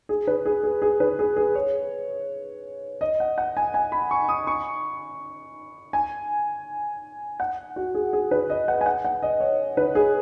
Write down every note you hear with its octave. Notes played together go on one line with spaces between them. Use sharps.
G#4
B4
G#4
G#4
G#4
B4
G#4
G#4
C#5
D#5
F#5
F#5
G#5
G#5
B5
C#6
D#6
C#6
G#5
F#5
F#4
G#4
G#4
B4
D#5
F#5
G#5
F#5
F#5
D#5
C#5
B4
G#4